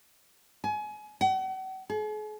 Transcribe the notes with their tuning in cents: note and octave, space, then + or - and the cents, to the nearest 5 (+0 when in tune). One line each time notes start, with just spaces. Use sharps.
G#5 +30
F#5 +40
G#4 +45